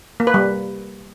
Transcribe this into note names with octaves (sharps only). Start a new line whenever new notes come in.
A#3
B4
G3